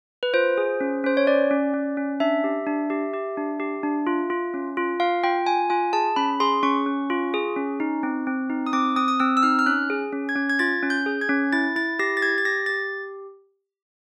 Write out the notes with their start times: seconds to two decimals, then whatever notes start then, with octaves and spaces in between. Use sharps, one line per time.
0.23 B4
0.33 F4 C5
0.58 G#4
0.81 C#4
1.04 C#4 C5
1.17 C#5
1.27 C#4 D5
1.51 C#4
1.74 C#4
1.97 C#4
2.20 D4 E5
2.44 G4
2.67 D4
2.90 G4
3.14 G4
3.37 D4
3.60 G4
3.83 D4
4.07 F4
4.30 F4
4.54 C#4
4.77 F4
5.00 F4 F5
5.24 F4 G5
5.46 F4 G#5
5.70 F4 G#5
5.93 G#4 A5
6.16 C#4 B5
6.40 G#4 C6
6.63 C#4 C#6
6.86 C#4
7.10 F4
7.34 G#4
7.56 C#4
7.80 D#4
8.03 C4
8.27 C4
8.50 D#4
8.66 D#6
8.73 C4 D6
8.96 C4 D#6
9.08 D#6
9.20 C4 E6
9.37 E6
9.43 D#4 F6
9.59 F6
9.66 C#4 F#6
9.90 G#4
10.13 C#4
10.29 G#6
10.36 C#4
10.50 G#6
10.59 F4 A6
10.83 C#4
10.90 G6
11.06 G#4
11.21 G#6
11.29 C#4
11.53 E4 A6
11.76 E4 A6
11.99 G4 A#6
12.17 A6
12.22 G4 G#6
12.38 A6
12.45 G4 A#6
12.66 G4 A6